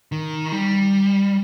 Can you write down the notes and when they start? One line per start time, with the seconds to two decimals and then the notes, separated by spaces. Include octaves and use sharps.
0.12 D#3
0.52 G3